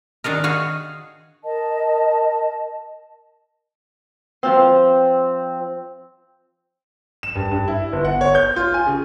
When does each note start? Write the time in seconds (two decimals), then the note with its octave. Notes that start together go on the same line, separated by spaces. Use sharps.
0.24 D#3 D4 G#4 A#4
0.44 F#4 G#4 F5
1.44 A#4 D#5 A5
4.43 F3 C4 F4 C5
7.23 E7
7.35 G2
7.52 G2
7.68 E4
7.93 G1
8.05 F#5
8.21 C#5
8.35 G6
8.56 F4
8.74 G#5
8.87 C#3